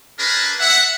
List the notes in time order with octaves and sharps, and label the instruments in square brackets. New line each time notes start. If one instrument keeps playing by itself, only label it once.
[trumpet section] D4 G#4 A#4 B4
E5 F#5